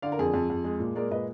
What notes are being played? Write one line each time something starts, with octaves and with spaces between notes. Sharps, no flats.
D3 D5 F5
A#4
F2 G#4
F2
F2
G#3
A#2
G#3 A#4 D5
A#2 B4 D#5